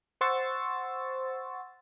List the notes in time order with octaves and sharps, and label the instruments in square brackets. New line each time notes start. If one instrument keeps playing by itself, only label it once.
[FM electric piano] C5 F#5 C6 C#6 E6 A6